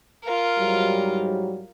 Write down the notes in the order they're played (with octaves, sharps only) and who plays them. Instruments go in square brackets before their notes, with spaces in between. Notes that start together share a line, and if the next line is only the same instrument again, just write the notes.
[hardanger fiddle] F4 A#4
[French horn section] G#2 F#3 G3